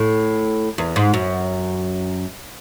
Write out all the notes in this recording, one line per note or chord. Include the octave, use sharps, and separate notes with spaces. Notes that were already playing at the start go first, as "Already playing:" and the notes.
Already playing: A2
E2
G#2
F#2